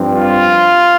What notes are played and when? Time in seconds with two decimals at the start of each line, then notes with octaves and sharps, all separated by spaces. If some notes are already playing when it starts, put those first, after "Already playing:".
Already playing: G2 F3 C4
0.15 F4